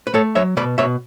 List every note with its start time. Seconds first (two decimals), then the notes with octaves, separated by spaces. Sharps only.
0.07 B4
0.14 A3 A4 C#5
0.35 F#3 C#5 E5
0.57 B2 B4 D5
0.78 B2 C#5 E5